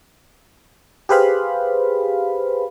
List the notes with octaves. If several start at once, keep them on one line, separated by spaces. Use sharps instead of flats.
G4 G#4 B4 C5 F5 B5